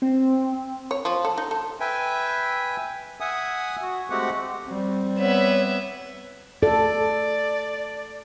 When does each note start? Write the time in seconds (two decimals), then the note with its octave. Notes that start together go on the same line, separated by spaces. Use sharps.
0.02 C4
0.91 C#5
1.05 F3
1.25 A4
1.38 D#4
1.51 A4
1.80 B4 E5 G5 G#5
3.20 E5 F#5 G#5 D#6
3.82 F#4
4.10 G#3 A3 C4 F#4 G4 F#5
4.66 G3 C4
5.19 B3 C#5 E5
6.63 A4 D5